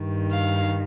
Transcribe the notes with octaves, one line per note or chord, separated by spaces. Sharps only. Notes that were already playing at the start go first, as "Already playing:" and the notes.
Already playing: G2 D#3
F5